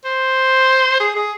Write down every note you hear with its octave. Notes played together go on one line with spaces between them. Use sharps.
C5
G#4
G#4